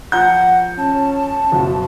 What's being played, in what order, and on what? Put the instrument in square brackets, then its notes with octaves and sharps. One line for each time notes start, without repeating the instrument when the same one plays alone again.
[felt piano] F3 A#5 G6 [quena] F#5
[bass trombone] C#4 [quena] A5
[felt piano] F#1 B2